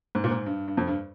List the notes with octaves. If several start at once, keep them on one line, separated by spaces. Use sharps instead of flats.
G#2
A#2
G#2
G2
G2
F2
G2